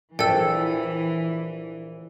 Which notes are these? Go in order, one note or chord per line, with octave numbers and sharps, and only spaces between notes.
A#1 E3 A4 G5 E6